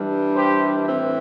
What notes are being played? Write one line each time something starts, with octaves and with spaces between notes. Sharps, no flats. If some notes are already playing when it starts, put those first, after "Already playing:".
Already playing: G2 E3 G3 D4
G4 C5
A2 E3 C4